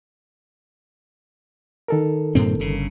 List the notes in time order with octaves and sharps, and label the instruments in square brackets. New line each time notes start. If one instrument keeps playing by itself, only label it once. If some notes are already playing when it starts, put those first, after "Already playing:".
[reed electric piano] D#3 A4 A#4
[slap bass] G2 A#2 C4
G1 C#3